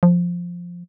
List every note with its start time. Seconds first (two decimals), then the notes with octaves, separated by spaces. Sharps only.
0.03 F3